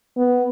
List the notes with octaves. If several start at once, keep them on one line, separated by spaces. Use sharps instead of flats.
B3